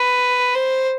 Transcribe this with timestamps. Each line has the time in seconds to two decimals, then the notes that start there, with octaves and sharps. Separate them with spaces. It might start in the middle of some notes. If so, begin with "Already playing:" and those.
Already playing: B4
0.55 C5